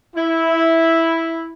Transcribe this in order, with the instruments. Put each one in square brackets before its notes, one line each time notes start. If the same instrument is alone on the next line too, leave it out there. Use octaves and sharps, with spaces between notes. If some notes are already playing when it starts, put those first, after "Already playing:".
[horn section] E4